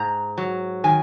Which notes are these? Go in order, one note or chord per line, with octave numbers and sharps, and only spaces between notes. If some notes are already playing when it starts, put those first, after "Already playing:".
Already playing: G#2 A#5
F#3
D#3 G#5